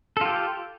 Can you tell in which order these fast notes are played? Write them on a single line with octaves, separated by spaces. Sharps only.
A4 F4 G4